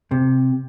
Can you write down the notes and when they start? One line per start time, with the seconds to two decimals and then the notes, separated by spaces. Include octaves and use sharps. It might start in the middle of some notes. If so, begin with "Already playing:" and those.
0.11 C3